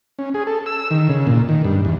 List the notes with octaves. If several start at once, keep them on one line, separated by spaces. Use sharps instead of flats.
C#4
G#4
A4
E6
D#3
C#3
A#2
D#3
G2
E2